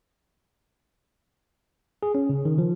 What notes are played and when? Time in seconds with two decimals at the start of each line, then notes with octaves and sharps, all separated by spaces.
2.03 G#4
2.15 C#4
2.29 C#3
2.45 D#3
2.58 F3